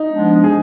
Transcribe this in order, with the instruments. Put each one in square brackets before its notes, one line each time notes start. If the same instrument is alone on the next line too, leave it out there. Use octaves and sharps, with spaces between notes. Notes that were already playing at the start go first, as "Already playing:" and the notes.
Already playing: [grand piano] D#4
[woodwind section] F3 G#3 B3 D4
[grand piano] G#4